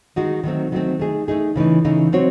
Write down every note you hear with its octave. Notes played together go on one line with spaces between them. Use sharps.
D#3 G#3 D#4 F#4
D#3 F#3 A3 C4
D#3 F#3 A3 C4
A3 D#4 G#4
A3 D#4 G#4
C#3 E3 A3 D#4
C#3 E3 A3 D#4
F#3 C4 F#4 C#5